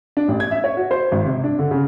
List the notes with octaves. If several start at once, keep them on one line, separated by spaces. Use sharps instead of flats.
D4
A1
G#6
E5
C#5
F#4
C5
G#1
C3
D4
D3
C#3